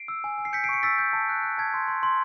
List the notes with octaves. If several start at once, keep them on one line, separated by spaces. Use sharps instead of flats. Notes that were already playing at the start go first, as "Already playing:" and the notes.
Already playing: C7 D7
E6
G#5
G#5
C7
G6 B6 C#7
C7 D7
C#6 B6 C#7
E6 A6 B6
G6
A5
F#6
F#6
A5 G#6
C6
C6
C6